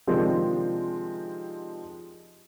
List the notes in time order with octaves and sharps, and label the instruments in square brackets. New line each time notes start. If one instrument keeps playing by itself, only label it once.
[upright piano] C3 D#3 F3 G#3 C4 D4